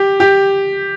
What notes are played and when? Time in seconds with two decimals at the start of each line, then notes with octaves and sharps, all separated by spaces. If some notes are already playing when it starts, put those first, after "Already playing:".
Already playing: G4
0.20 G4